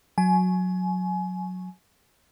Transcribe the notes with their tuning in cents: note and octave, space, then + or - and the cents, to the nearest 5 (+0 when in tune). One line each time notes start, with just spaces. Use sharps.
F#3 -15 G#5 +25